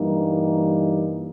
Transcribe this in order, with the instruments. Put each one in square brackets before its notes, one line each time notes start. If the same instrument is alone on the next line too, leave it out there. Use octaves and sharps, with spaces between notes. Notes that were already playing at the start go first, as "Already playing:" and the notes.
Already playing: [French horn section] G2 E3 G3 A#3 D#4